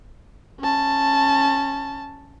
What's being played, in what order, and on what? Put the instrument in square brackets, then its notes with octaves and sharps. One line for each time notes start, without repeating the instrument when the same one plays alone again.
[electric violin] C#4 A5